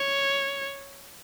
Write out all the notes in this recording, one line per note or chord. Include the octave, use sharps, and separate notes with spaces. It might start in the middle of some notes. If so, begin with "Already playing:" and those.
Already playing: C#5